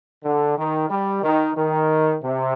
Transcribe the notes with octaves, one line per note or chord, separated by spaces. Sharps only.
D3
D#3
G3
D#3
D#3
C3